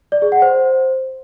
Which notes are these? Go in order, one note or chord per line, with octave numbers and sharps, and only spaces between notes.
D5
G#4
F#5
C5